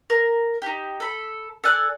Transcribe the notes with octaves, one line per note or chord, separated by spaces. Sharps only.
A#4
D#4 G4
A4 B5
A4 D5 G#5 F#6